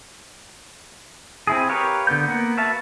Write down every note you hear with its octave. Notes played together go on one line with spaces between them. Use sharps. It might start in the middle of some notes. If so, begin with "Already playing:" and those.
C4 E4 G#4
G4 A#4 B4 C#5 F5
D3 B3 G6
A#3 B3 F#5
F#4 B4 E5 F5 A5